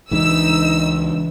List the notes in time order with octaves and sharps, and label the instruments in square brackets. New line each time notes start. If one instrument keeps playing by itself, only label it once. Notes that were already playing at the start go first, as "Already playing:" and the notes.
[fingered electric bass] C#2 G#3 D4 [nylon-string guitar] E3 [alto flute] D#4 [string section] E6